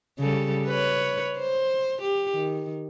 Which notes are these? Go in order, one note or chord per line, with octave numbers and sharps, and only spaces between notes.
C#3 G3 A4
B4 C#5
C5
G4
D#3